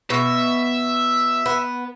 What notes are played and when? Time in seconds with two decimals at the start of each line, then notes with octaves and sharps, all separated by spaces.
0.10 B2 E5
1.46 B3